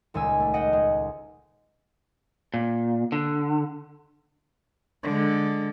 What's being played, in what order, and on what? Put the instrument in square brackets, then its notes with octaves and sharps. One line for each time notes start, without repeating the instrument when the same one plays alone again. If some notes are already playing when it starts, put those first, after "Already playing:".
[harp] D#1 C#2 G#5 E6
A3
D#5 F#5 G5
G#3
[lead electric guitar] A#2
D3
[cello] D3 G#3